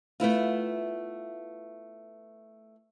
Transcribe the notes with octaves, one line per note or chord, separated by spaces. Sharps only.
A3 B3 E4 F4